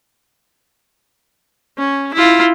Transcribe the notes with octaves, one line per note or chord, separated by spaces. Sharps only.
C#4
E4 F4